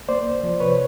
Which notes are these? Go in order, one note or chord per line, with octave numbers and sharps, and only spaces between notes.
A#3 C5 D5
C2
F3
C3 B4 C#5